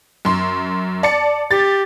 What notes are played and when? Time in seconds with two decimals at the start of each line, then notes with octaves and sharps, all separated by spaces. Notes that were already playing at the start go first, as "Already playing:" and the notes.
0.25 F#2 C6
1.03 D5 A5 C#7
1.51 G4 A6